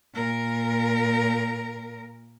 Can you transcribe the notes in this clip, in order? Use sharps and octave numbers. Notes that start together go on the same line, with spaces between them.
A#2 A#4